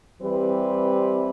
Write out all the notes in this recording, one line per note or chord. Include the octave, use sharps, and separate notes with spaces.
E3 G3 C4 G4 B4